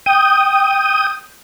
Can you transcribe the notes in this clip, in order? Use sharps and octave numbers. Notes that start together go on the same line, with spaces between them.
G5 D#6